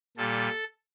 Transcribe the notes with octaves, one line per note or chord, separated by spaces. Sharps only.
A#2 G3 A4